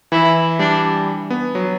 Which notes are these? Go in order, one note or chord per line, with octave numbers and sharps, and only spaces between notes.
E3 E4
G3 D4
B3
F#3